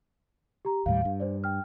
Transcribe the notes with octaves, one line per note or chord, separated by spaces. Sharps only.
G4 A#5
D#2 A2 G3 F5
G2
D4 C5 D5
G5 F6